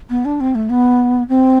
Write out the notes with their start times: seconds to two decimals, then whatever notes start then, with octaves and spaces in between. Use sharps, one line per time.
0.10 B3
0.25 D4
0.40 C4
0.55 A3
0.70 B3
1.29 C4